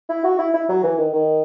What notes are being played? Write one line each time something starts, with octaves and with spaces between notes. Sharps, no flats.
E4
F#4
E4
E4
F#3
E3
D#3
D#3